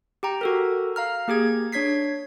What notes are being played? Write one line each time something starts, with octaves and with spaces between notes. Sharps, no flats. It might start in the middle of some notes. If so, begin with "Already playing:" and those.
G4 G5 A#5
F#4 A4 A#4
F5 A#5 F6
A#3 G4 G#4 G#6
D4 C#5 G#6 B6 C7